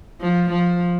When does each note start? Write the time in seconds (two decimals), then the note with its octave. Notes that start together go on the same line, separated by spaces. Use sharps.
0.21 F3
0.51 F3